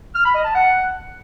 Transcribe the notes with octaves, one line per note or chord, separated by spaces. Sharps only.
F6
B5
D#5
A5
F#5